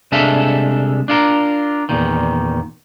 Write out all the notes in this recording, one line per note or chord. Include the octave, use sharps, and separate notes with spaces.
C2 G#3 D4 A4 E5 F5
D4 F4 A#4
E2 A#2 D#3